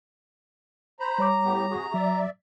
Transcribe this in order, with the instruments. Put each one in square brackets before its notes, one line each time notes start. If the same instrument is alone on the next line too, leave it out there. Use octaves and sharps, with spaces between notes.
[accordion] C5 B5 [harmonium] A#5
[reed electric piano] G3 C#5 D6
[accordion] A2 B3 G4
C3 F#4 G#4
[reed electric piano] F#3 [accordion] D5 E5